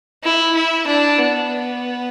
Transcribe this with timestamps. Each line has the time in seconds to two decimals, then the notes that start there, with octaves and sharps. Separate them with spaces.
0.23 E4
0.55 E4
0.86 D4
1.18 B3